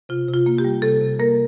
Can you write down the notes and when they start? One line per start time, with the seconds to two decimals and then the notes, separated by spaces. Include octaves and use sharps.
0.09 C3 F4
0.28 C3
0.34 F4
0.46 A#3
0.58 G4
0.65 G3
0.82 C3 A4
1.01 C3
1.19 A#3 A#4